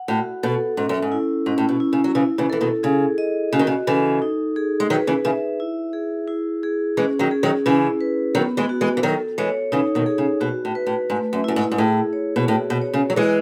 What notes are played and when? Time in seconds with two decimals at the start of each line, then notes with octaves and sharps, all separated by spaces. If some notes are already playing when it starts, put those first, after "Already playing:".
Already playing: F#5
0.08 A2 F#4
0.43 B2 A4
0.77 G#2 C#4
0.89 F#2
1.02 G#2
1.12 E4
1.46 G#2 C#4
1.58 A2
1.69 B2
1.80 E4
1.93 C#3
2.04 F#3
2.15 C#3 E3 E4
2.38 C#3 E3
2.50 E3 A4
2.61 B2 D#3
2.83 C#3 G#4
3.18 D#5
3.53 C#3 F#4
3.59 D#3
3.67 C#3
3.87 C#3 E3 A4
4.22 D#4
4.56 G#4
4.80 G#3
4.90 D#3 F#3 B4
5.07 C#3 E3
5.25 C#3 E3 E5
5.60 E4
5.93 G#4
6.28 E4
6.63 G#4
6.97 E3 G#3 C#4
7.19 D#3 F#3
7.31 G#4
7.43 D#3 F#3
7.66 C#3 E3 E4
8.01 B4
8.35 D#3 F#3 B3
8.57 E3 G#3
8.69 F#4
8.81 E3 G#3
8.97 E3
9.03 D#3 F#3 A4
9.38 E3 G#3 C#5
9.72 C#3 E3 D#4
9.95 B2 D#3
10.06 G#4
10.18 C#3
10.41 B2 F#4
10.65 A2
10.75 B4
10.87 A2
11.10 G#2 A3
11.33 F#2
11.44 F#2 E4
11.56 G#2
11.72 G#2
11.78 A2 G#4
12.13 C#5
12.36 B2
12.48 A2 F#4
12.70 B2
12.82 C#5
12.93 C#3
13.10 F#3
13.16 E3 G#3 E4